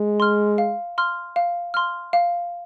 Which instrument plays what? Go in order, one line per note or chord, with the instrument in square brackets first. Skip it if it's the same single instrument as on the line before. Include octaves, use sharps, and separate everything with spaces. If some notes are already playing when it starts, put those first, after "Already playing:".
Already playing: [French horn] G#3
[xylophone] C6 F6
F5
C6 F6
F5
C6 F6
F5